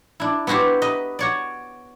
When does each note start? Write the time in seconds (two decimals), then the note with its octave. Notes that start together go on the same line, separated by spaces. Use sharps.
0.20 D4 E4
0.47 B3 E4 F#4 G4 C5
0.82 B4 D#5
1.19 F#4 C#5 D5